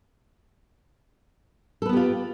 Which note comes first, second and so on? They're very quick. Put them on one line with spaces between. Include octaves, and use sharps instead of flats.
A4 B4 B3 G4 F4